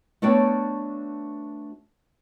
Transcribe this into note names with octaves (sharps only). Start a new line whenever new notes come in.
A3 B3 D4 F#4 C#5 G5